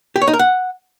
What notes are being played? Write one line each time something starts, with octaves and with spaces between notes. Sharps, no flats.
G4
C#5
D#4
A#4
F#5